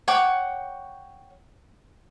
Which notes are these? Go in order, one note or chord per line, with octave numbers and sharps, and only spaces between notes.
C#5 F#5 G5 D6